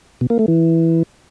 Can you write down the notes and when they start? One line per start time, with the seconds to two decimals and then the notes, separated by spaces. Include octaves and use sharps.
0.21 B2
0.30 A#3
0.39 A3
0.48 E3